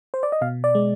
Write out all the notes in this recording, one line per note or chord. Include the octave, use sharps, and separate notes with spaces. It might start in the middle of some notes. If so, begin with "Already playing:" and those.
C5
D5
D#5
B2 F5
D5
G#3